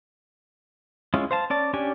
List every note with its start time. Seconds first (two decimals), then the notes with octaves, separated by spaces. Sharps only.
1.14 G#3 C#4 E4 F4
1.31 C5 F5 A5
1.50 C#4 D5 A5
1.73 C#4 D4 G4 D5 G#5